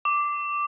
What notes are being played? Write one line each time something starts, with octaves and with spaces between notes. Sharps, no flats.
D6